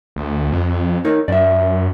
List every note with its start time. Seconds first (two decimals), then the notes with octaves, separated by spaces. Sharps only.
0.16 D2
0.52 F2
1.05 D#4 A#4 C#5
1.28 F#2 D5 E5